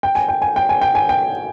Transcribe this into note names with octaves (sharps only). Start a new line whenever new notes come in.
G5
G#5
G5
G#5
G5
G#5
G5
G#5
G5